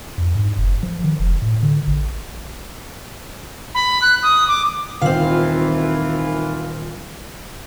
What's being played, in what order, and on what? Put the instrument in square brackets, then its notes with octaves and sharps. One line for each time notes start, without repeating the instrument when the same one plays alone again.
[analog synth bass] F2
G#2
F#1
F3
D#3
F1
A2
D3
A1
[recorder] B5
F#6
D#6
D6
[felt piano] D#1 [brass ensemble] D#3 E3 F4 [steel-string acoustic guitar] C4 F5